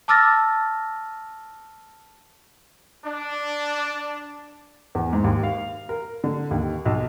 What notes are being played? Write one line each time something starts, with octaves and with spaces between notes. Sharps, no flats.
A5 D6 E6 F6 A6 A#6
D4
E2
G#2
D#2
F5
A#4
D3
D#2
B1